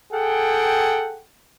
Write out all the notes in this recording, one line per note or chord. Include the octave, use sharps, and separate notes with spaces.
G#4 A4 F#5 G5